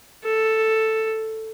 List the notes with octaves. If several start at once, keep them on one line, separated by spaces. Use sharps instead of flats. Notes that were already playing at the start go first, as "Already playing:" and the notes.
A4